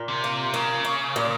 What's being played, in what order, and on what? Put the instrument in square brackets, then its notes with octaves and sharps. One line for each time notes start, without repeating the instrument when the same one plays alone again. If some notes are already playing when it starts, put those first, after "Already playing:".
Already playing: [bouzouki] A#2
[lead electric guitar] C3
[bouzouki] A#3
[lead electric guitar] C#3 [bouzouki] A#3
[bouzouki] A#3
A#2